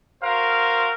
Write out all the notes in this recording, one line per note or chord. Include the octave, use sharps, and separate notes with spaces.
F#4 A#4 C5 F5